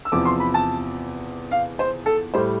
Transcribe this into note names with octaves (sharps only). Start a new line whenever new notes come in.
E6
E2 C3 F3 D6
C6
B5
A5
F5
C5
A4
A2 G3 C5